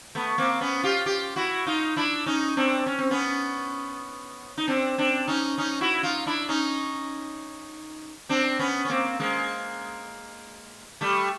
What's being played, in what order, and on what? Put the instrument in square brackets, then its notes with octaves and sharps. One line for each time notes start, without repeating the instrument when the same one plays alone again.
[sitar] A3 B3
A#3 C4
B3 C#4
F4 G4
F4 G4
E4 F#4
D#4 F4
D4 E4
C#4 D#4
C4 D4
C#4
C4
B3 C#4
D#4
C4 D4
C4 D4
C#4 D#4
C#4 D#4
E4 F#4
D#4 F4
D4 E4
C#4 D#4
C4 D4
B3 C#4
C#4
A#3 C4
G#3 A#3
G3 A3